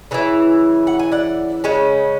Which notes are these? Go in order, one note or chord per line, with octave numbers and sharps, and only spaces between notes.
C#3 E3 E4
F#5
G#5
D5 F#5
C#3 G#3 C#4